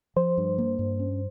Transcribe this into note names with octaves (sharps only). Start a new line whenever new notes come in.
F3 C5
G2
A#3
G2
C#4